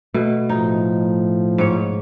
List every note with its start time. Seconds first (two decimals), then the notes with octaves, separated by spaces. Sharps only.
0.14 B2 A3
0.49 A2 F3 D#4
1.58 G#2 C#5